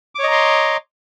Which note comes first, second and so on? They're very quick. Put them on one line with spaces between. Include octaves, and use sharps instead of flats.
D6 C#5 D#5 A#5 C6